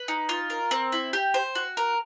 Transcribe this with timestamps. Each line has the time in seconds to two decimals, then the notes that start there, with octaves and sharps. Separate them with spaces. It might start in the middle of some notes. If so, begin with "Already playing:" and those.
Already playing: B4
0.08 D#4
0.29 F4
0.50 A#4
0.71 C4
0.92 E4
1.13 G4
1.34 C5
1.55 F#4
1.77 A#4